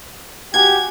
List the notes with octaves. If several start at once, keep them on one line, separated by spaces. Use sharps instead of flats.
F#4 G4 F#5 G#5 G#6